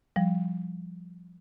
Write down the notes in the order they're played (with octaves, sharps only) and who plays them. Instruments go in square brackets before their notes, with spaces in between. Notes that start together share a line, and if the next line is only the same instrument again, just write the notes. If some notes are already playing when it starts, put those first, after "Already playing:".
[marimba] F3 G3